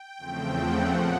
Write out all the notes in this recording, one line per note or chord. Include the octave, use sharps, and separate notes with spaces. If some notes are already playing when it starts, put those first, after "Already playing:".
Already playing: G5
E2 C#3 F3 A3 C4
F#5
A#2 F3 F#5